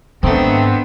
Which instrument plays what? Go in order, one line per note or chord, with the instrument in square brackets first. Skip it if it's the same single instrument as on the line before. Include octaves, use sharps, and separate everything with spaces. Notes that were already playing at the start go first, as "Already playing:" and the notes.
[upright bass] G#2 [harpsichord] D#3 A3 [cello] B3 D4 [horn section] C4